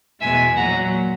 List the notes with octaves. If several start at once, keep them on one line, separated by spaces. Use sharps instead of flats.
E2 B2 G#3 E5 G#5
A#2 F#3 F#5 A#5